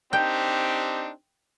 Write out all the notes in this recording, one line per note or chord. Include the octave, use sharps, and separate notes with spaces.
C4 D4 D#4 G4 G5